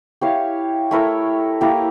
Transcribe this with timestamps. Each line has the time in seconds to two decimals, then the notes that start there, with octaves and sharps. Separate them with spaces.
0.21 E4 G4 C#5 F5
0.91 A3 E4 A#4 C#5
1.61 A#3 E4 G4 A#4